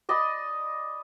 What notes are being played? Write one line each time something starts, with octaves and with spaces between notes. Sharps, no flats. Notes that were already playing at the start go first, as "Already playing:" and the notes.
D5 D#5 B5 C6